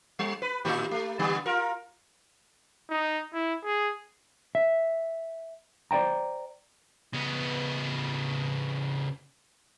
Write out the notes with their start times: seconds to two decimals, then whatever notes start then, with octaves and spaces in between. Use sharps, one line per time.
0.19 G3
0.42 B4
0.65 A2 D#3 G4
0.91 A3
1.19 D3 G3 B3
1.46 F4 A#4
2.90 D#4
3.33 E4
3.64 G#4
4.55 E5
5.91 C5 D5 D#5 G5 A#5
7.14 C#3 B3